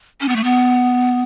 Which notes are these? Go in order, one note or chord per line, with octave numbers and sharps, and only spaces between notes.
C#4
B3
A3
B3